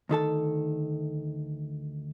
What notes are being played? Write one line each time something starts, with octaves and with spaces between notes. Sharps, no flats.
D2 D#3 A4 A5